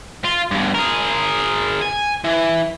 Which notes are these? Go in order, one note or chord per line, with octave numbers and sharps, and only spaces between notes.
F4
G2 B2
G#4 A#4
G#5
E3